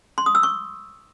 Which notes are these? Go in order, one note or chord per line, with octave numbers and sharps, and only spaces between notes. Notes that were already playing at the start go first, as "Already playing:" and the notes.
C6
D#6
E6
C#6